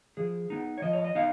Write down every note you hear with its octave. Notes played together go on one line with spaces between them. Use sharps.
F3 G#4
B3 D#4
C#5
F3 D#5
C#5
D#5
B3 D#4 F5